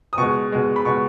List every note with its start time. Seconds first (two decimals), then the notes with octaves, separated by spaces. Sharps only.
0.13 D#6
0.18 B2 G#3 C#6
0.52 B2 G#3
0.76 B5
0.85 B2 G#3 C#6